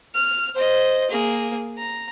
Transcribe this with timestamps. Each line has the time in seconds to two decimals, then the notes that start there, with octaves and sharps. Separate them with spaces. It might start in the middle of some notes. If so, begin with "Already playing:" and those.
0.14 F6
0.55 C5 D#5
1.10 A#3 G#4
1.78 A#5